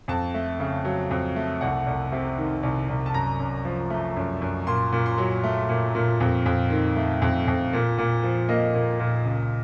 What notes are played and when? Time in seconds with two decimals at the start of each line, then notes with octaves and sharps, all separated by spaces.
0.08 F2 A5
0.34 A3
0.60 C#3
0.85 F#3
1.11 F2
1.36 A3
1.61 C2 F#5
1.87 C2
2.12 C3
2.38 D#3
2.63 C2
2.89 C2
3.06 A5
3.14 F#2 A#5
3.40 F#2
3.65 F3
3.90 A3
4.16 F#2
4.42 F#2
4.67 A#2 C6
4.92 A#2
5.06 C6
5.18 F#3
5.44 A3
5.69 A#2
5.95 A#2
6.20 F2
6.46 F2
6.70 D#3
6.96 A3
7.22 F2
7.47 F2
7.73 A#2
7.98 A#2
8.24 F3
8.49 A#3 D#5
8.75 A#2
9.00 A#2
9.25 C#2